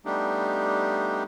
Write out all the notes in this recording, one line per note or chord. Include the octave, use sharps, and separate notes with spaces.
G3 A3 B3 D4 D#4 G4